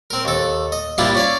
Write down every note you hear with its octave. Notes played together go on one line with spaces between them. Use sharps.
C4 A#4
D#2 A4
D#5
F3 G3 A#3 D4 E4 F4
C#4 D5 F5